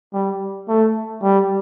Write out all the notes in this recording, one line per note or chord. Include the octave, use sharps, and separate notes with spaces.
G3
A3
G3